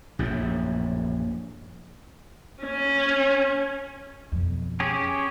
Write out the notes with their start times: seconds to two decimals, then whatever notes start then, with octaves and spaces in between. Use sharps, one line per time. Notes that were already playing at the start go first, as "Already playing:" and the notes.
0.19 A#1 F#2 A2
2.63 C#4
4.32 F2 B2
4.80 C#4 G4 G#4